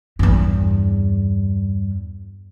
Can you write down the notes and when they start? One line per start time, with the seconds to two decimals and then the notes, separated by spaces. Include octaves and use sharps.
0.19 E2 G2